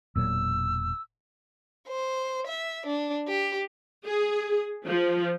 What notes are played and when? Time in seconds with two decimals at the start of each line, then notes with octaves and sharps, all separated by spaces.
0.16 E1 A#2 F#3 E6
1.88 C5
2.47 E5
2.86 D4
3.28 G4
4.06 G#4
4.86 F3